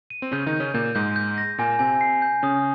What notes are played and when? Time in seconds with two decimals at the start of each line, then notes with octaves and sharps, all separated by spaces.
0.10 D#7
0.22 C4
0.32 C#3 C#4 G6
0.46 D#3 D#4
0.53 G6
0.60 C#3 C#4
0.74 A#2 A#3 G6
0.95 G#2 G#3 G6
1.16 G6
1.38 A#6
1.58 A#2 A#3 G#5
1.79 C3 C4 G#5
2.01 C7
2.22 G6
2.43 C#3 C#4 D#6